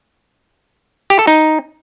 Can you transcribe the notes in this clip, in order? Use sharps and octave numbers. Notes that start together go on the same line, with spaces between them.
G4
A4
D#4